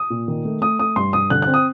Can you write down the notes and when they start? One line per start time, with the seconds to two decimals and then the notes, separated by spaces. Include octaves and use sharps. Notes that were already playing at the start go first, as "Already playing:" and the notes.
Already playing: D#6
0.10 A#2
0.28 D#3
0.45 A3
0.61 A3 D#6
0.79 A3 D#6
0.96 G2 C6
1.13 G2 D#6
1.30 D3 F#6
1.42 C4 F#6
1.54 D#6